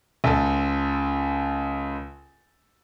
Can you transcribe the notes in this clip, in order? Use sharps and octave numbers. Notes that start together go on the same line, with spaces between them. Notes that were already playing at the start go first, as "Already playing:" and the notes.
C#2 A4